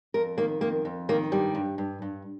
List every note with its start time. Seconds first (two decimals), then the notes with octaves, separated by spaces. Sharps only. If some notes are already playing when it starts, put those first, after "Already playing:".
0.14 F2 A#4
0.37 D#3 A#3
0.61 F2 A#3
0.85 F2
1.09 D#3 A#3
1.32 G2 G3
1.55 G2
1.78 G2
2.02 G2